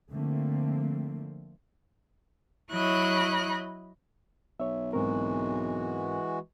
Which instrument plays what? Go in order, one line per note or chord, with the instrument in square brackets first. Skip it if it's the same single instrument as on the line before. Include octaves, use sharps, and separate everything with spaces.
[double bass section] D3 F3 A3 A#3 C4
[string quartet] F#3 E4 C#5 D#5 B5 F#6
[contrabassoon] B1 [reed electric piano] C#5 E5
[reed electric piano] G#2 C4 A#4 [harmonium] E3 G#3 F#4